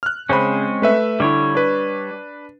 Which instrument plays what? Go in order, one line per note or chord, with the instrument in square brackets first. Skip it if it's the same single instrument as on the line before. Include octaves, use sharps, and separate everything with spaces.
[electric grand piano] F6 F#6
[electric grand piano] C#3 C5 B5 [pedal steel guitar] G#3 C4 C#4
[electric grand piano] A3 B4 E5
[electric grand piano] D3 E4 [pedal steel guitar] G3 C#5
[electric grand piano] D4 B4